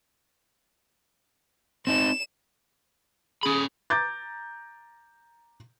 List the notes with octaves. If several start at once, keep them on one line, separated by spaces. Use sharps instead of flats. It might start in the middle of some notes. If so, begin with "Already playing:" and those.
C4 D#4 E7
C#4 G#4 B5
A#5 D6 G6 A6